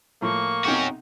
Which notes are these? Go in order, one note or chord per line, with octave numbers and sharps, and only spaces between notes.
A2 F3 A#3 C#6
B1 C3 C#4 D#4 F#4 G5